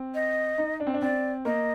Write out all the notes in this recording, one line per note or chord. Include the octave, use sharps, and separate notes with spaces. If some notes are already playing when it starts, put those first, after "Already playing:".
Already playing: C4
D#5
D#4
D4
C4
D4
C4 D5
A#3 D#5